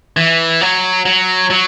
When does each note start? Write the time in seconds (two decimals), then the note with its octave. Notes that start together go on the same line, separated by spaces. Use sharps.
0.17 E3
0.61 F#3
1.05 F#3
1.50 F#3